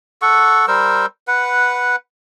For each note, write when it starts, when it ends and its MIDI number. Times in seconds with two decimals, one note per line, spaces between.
0.22 0.66 69
0.22 0.66 78
0.22 0.66 85
0.68 1.06 55
0.68 1.06 70
0.68 1.06 72
0.68 1.06 88
1.28 1.96 71
1.28 1.96 78